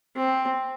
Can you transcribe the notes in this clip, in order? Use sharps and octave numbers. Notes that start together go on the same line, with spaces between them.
C4